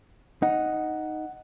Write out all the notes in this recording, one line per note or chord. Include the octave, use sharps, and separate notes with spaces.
D#4 F#5